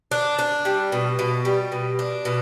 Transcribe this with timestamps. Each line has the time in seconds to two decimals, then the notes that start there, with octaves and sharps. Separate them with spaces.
0.11 D4
0.39 D4
0.65 G3
0.92 B2
1.19 B2
1.45 G3
1.72 B2
1.99 D4
2.25 B2